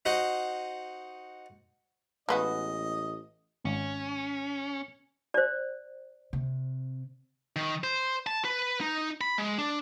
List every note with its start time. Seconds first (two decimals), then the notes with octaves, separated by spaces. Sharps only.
0.05 D#4 F#4 C5 D#5 F#5
2.29 A1 G#3 B3 F#4 D#5
3.65 G#1 C#4
5.34 C5 D5
6.33 C3
7.56 D#3
7.84 C5
8.26 A5
8.45 B4
8.81 D#4
9.21 B5
9.38 G#3
9.58 D4